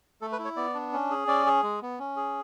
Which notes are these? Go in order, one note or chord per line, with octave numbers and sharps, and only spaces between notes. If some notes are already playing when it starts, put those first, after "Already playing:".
A3 A4
B4
E4
C#5
B3 D5
D4
C#4
G#4
C#4 D5
G#4
G#3
B3
C#4
G#4